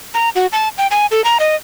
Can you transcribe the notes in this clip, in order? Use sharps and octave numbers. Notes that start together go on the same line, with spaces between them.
A#5
F#4
A5
G5
G#5
A4
A#5
D#5